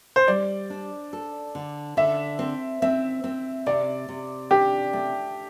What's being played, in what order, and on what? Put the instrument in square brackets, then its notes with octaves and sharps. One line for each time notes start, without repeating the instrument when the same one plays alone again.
[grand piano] C5
[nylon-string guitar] G3 [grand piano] D5
[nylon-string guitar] D4
A4
D3
[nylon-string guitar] D3 [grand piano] E5
[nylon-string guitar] C4
[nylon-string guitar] C4 [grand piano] E5
[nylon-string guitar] C4
[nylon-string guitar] C3 [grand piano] D5
[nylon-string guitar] C3
[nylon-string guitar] D4 [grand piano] G4
[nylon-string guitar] A3